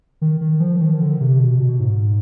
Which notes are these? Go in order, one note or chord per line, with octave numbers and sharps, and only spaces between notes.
D#3
D#3
F3
F3
D#3
D3
C3
B2
B2
G#2